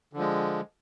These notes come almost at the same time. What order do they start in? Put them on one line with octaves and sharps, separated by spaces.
D3 F3 G#3